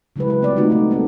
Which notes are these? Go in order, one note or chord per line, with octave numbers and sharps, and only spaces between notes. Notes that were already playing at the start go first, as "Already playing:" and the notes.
C#3 F#3 G#3 E4 G4 B4
G4 B4
G3 G#3 B3 C4 D5
A3 B3 D#4 F4 F#4
A3 D#4
A3 A#3 C4 D#4 A4